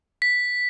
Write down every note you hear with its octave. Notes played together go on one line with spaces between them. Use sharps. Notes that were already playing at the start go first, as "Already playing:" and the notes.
B6